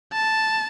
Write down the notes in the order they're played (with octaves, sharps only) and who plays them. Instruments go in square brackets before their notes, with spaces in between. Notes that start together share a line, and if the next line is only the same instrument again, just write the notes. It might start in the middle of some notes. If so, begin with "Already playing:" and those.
[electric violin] A5